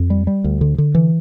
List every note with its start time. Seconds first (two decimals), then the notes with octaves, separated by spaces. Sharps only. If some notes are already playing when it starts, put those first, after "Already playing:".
Already playing: F2
0.10 G3
0.27 G3
0.44 D2
0.61 D3
0.78 D3
0.95 E3